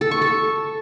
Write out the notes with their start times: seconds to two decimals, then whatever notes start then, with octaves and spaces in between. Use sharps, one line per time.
0.01 A4
0.11 C#6
0.22 A4